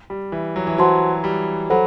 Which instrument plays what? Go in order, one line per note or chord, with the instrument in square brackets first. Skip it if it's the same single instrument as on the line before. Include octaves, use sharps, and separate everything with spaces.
[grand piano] G3
E3
F#3
E3
[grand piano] F#3 [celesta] F#4 C5 F#5 A5 C6
[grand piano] G3
[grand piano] F#3 [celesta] A4 C5 F#5 B5